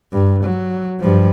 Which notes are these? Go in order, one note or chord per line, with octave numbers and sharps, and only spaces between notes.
G2
F#3
G2 F3